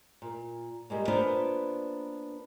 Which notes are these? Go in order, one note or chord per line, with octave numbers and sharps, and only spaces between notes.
A#2
G3 G#3 A#3
A#3 B3 D4 F4 B4 C5